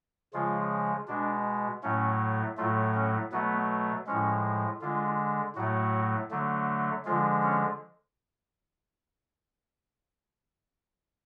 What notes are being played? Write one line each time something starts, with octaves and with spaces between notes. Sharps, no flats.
C#3 F3 G#3 F4
B2 G#3 D4
A2 F#3 A3 C#4
A2 F#3 A3 F4
C#4
B2 F#3 A3 B3
A2 F3 G#3 C#4
D3 G#3 F4
A2 F#3 A3 F#4
D3 F#3 A3
D3 F3 G#3 F4
C#4